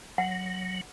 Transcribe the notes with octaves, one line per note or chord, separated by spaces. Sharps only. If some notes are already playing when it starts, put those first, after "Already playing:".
F#3 F#5